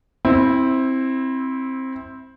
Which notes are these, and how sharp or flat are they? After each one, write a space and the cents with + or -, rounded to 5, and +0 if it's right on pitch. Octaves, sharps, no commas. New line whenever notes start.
C4 +10 E4 -15